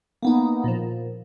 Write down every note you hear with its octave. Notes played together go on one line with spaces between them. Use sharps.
A#3 B3 D#4
A#2 F3